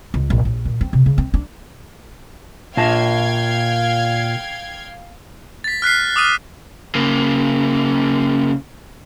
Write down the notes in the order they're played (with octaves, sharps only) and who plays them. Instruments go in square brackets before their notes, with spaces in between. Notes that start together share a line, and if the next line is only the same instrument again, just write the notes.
[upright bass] C#2
A#1
A#1
A#2
C4
C3
C#3
C4
D4
[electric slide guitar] A#2 A5 [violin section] F5 G5 G#6
[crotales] A6 B6
F6 F#6 B6 C7
D6 D#6 F6 D#7
[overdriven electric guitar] C#3 A#3